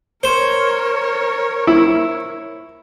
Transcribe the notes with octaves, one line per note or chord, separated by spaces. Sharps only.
A#4 C5 C#5
E4